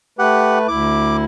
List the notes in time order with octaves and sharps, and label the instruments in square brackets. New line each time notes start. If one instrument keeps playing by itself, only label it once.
[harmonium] A3 B4 [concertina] G4 F#5
[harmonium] D2 E4 [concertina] D6